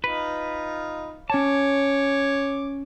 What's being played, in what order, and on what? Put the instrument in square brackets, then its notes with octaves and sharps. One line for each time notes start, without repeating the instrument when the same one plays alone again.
[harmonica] D#4 F4 [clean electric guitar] B4
[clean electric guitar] C#4 A5 [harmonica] C#5 D6